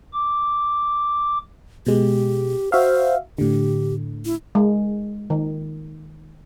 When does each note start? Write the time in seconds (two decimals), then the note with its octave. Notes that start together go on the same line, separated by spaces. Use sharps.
0.13 D6
1.86 B2 G#3 G4
2.72 F#4 C5 E5 F5
3.38 A2 D3 G4
4.25 E4
4.55 G#3
5.30 D#3